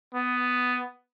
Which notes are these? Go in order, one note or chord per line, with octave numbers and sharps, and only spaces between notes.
B3